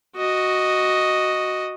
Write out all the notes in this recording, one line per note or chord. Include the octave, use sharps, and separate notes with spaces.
F#4 D#5